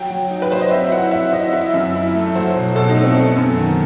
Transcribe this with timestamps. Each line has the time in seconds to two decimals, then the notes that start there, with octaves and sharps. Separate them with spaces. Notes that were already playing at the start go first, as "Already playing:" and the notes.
Already playing: F#3 G5
0.10 F#3
0.30 D#4
0.42 B4
0.51 F#3 C5
0.61 D#5
0.71 C4 E5
0.92 E4 F#5
1.11 C4 E5
1.33 E4 D#5
1.53 E4 E5
1.74 F#2
1.94 E4
2.14 A3
2.35 F#3 C5
2.56 B2
2.76 B2 A4
2.89 D#4
2.96 A3
3.03 C4
3.17 B3
3.37 F#2
3.57 D#3